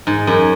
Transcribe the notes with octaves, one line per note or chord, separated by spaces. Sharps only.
G#2
F#2